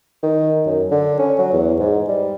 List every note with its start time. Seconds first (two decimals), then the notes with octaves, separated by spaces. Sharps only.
0.23 D#3
0.66 F#2
0.91 D3
1.19 C#4
1.38 F#3
1.53 E2
1.79 G#2
2.08 G3